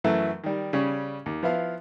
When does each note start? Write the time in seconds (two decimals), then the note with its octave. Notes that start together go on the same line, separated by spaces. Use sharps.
0.04 F#2 E3 F#3 A3
0.44 D#3 G3
0.73 C#3 G3 C#4
1.26 D#2
1.43 F3 B3 E4 F5